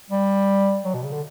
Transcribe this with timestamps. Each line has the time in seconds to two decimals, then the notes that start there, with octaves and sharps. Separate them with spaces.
0.10 G3
0.85 F#3
0.94 B2
1.03 C#3
1.12 D3